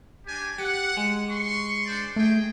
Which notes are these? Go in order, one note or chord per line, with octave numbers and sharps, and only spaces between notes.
D4 G4 G#5
G4 F#5
G#3
C6 C#6
D4 C5 D5
A3 D#4 G#4 G5